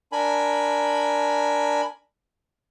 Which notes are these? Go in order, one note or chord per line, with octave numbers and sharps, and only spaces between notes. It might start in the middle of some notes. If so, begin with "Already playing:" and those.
D4 A#4 G#5 B5